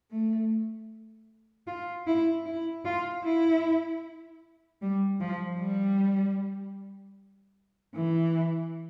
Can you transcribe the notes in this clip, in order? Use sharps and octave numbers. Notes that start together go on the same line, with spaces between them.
A3
F4
E4
E4
F4
E4
G3
F3
G3
E3